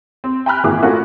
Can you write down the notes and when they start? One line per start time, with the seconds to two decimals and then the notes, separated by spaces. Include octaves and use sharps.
0.24 C4
0.46 G5 G#5 A#5 B5 F6 F#6
0.64 G#1 A#2 E3 G#4 E5 D6
0.82 A3 C#4 F4 F#4 A4 A#4